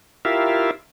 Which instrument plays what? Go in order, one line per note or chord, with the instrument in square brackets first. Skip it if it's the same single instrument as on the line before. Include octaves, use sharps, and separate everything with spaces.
[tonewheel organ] E4 F4 G4 A#4 E5 F5